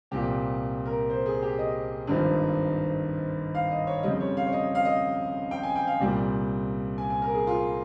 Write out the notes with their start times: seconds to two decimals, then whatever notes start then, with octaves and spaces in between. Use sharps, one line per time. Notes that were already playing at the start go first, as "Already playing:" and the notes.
0.11 C2 A#2 F3 G4
0.85 A#4
1.10 C5
1.26 G#4
1.42 G4
1.59 D#5
2.07 G#1 G2 F3
3.55 F5
3.71 D#5
3.87 C#5
4.03 F2 C#3 G3 D#5
4.20 C#5
4.37 F5
4.46 C#5
4.53 D#5
4.75 F5
4.85 D#5
5.51 G5
5.63 G#5
5.76 G5
5.87 F5
6.00 C2 A#2 G3
6.98 G#5
7.10 G#5
7.22 A#4
7.35 G#4
7.47 F4